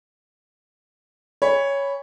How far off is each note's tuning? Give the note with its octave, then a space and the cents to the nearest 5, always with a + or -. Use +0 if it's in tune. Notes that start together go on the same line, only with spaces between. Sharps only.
C#5 +5 G#5 -35 B5 +0